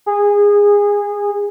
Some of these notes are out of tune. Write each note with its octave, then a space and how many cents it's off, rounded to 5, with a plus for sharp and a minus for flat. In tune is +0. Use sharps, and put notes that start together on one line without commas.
G#4 -20